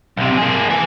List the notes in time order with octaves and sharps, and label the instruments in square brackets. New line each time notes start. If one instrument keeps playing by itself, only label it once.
[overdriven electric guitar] B1 C3
A#3 G#4
B4 G#5